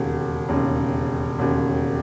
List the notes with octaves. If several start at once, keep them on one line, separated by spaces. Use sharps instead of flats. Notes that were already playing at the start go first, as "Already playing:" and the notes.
Already playing: E1 D#2 C#3
E1 D#2 C#3
E1 D#2 C#3